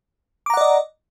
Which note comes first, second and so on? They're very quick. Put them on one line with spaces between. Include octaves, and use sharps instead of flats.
D6 A#5 F#5 D5 D#5